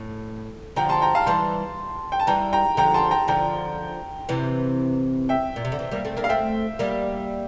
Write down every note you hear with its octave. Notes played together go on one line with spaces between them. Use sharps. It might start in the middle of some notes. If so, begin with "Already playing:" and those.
Already playing: A2
D3 F3 G5 A#5
A5 C6
G5 A#5
F5 A5
E3 G3 A5 C6
G5
A5
E3 G3 G5 A#5
G5 A#5
D3 F3 G5 A#5
A5 C6
G5 A#5
D3 F3 G5 A#5
C3 E3
E5 G5
A#2
C3
D3
C3 E3
G3 A#3
A3 C4
A#3 D4
F5
A3 C4 E5 G5
G3 A#3